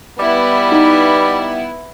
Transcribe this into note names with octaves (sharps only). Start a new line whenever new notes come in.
G3 B3 E4
D#4